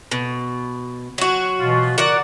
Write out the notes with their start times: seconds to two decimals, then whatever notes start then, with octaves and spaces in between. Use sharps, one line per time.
0.11 B2
1.18 F#3 F#4
1.60 B2 E3 F4
1.98 F#4 A#4 D5 F#5